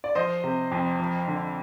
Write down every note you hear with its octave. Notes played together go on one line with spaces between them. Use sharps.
D5
F3 C5 D#5
C3
F2
F3
D3